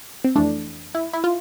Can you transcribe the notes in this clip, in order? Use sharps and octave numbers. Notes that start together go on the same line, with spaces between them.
C4
F2 E3 A3 D4
E4
E4
F4